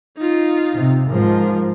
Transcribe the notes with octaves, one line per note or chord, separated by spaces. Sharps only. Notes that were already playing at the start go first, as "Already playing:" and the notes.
D#4 F4
C3
G#2 F3 A#4